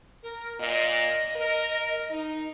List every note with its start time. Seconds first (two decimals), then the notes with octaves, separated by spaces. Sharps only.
0.23 A#4
0.60 A#2 D#5
1.36 A#4
2.11 D#4